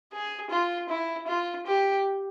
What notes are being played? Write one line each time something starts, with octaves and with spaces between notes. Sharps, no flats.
G#4
F4
E4
F4
G4